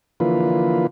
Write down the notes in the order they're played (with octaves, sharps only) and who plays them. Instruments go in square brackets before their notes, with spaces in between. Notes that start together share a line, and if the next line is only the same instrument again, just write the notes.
[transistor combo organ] D3 E3 F3 A#3 F4 B4